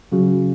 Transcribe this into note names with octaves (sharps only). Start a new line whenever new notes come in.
C#3 F#3